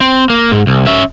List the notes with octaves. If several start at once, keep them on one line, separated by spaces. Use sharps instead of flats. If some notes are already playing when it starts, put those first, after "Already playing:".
C4
A#3
G#2
C2
C#4 E5